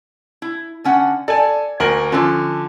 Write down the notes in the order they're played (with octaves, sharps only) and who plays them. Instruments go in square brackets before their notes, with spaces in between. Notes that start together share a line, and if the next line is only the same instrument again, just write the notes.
[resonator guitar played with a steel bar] E4
D3 C#4 F#5
[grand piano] A4 G#5 [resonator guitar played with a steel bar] D5
[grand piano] D2 A#4 F#7 [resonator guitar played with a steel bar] G#5
[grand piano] D3 F3 [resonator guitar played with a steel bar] C#4 A4